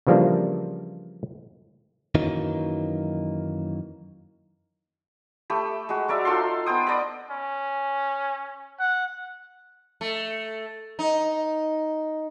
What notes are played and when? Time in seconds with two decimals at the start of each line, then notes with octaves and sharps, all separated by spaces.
0.07 C#3 E3 F3 G3 A#3 D4
2.15 F#2 D#3 E3 F#3 A#3 D#4
5.50 A3 G4 B5
5.89 G#3 F#4
6.08 F#3 A#4 D5 E5
6.25 D#4 F4 A4 C6
6.66 B3 C5 G5 D#6
6.87 D5 D#5 A#5 B5
7.30 C#4
8.79 F#5
10.01 A3
10.99 D#4